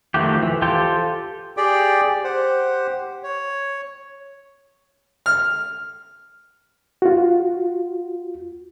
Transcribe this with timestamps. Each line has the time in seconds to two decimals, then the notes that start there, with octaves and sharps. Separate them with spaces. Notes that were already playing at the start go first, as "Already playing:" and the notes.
0.14 D#3 F3 A3 F#4 G4
0.42 E3
0.62 F4 G4 A4 C5 G5
1.57 G4 G#4 D5 G5
2.24 G4 C5 F#5
3.23 C#5
5.26 F6
7.02 F4 F#4